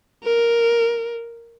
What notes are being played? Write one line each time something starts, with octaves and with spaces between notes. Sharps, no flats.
A#4